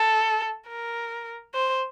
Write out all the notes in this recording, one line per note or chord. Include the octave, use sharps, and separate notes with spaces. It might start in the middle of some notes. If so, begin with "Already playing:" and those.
Already playing: A4
A#4
C5